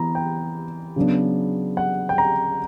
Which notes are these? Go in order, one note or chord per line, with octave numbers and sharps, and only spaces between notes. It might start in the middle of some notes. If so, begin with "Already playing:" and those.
Already playing: E3 B3 A#5
G5
C#3 F#3 B3 D4
F#5
G5
A#5